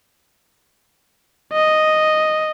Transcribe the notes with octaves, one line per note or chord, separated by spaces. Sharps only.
D#5